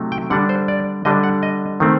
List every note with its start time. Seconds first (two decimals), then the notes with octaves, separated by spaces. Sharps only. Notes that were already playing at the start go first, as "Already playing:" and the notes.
Already playing: C3 F#3 A3 D#4
0.12 G5
0.30 D3 G3 D4 F#5
0.49 C5
0.68 D5
1.05 D3 G3 D4 D#5
1.23 F#5
1.43 D#5
1.80 D#3 A3 C4